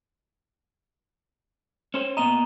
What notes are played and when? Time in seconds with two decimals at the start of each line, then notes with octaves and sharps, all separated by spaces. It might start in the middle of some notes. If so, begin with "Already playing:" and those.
1.94 C#4 C5
2.17 A#2 B3 D#5 A#5 E7